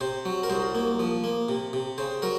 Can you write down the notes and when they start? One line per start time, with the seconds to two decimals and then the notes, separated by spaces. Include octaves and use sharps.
0.01 C3 C5
0.25 F#3
0.43 A#4
0.50 C2 C5
0.75 A#3
1.00 F3
1.24 A#3
1.49 C3
1.73 C3
1.98 C#3 C5
2.22 F#3 A#4